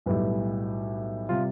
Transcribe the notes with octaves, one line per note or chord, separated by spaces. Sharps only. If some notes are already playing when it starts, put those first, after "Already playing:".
B1 A2 G3 B4
C3 G3 F4